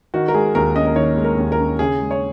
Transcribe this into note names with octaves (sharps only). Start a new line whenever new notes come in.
D#3 F#4
A#4
G#3 G#4
D#2 A#4
C#4 D#5
A#4
D#3 C#5
G#3
A#4
D#2
A#4
C#4
C#3 G#4
G#3
C#5